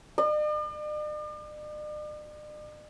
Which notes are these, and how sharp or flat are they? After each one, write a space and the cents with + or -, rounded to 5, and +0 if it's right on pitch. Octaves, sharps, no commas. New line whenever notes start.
D5 +45